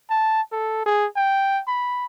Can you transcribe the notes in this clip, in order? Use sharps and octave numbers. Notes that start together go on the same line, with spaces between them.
A5
A4
G#4
G5
B5